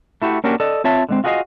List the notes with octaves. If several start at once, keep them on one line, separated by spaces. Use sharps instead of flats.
A3 E4 F#4 G4
A#3 C#4 D4 F#4 G4 A#4
A4 D5 D#5
C4 F4 C#5 E5 A5
D3 G#3 C4
F4 F#4 G#4 A4 D#5 F5